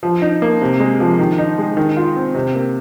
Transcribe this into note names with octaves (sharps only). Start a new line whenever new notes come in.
F3
D#4
A#3
C3
G#3
F3
D#3
D#4
G#3
D#3
F4
C4
C3
A#3